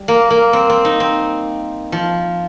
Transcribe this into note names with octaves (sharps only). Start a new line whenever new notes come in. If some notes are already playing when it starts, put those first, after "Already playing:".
Already playing: G3
A#3
A#3
C4
C4
D#4
C4
F3